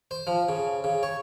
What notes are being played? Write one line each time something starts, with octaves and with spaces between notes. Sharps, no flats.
C5
F3
C#3
C#3
C#5